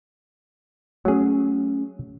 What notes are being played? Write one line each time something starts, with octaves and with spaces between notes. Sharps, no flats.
F#3 A3 C#4 G#4